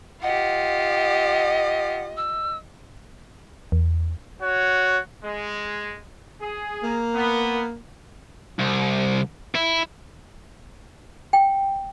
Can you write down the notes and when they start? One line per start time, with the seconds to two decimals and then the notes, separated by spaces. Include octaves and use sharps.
0.22 F4 G4 D#5 F#5
2.17 E6
3.72 E2
4.40 F#4 C#5
5.23 G#3
6.41 G#4
6.83 A#3
7.14 B3
8.59 C2
9.55 E4
11.33 G5